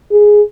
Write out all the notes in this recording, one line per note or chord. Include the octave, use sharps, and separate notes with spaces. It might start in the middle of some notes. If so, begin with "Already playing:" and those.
G#4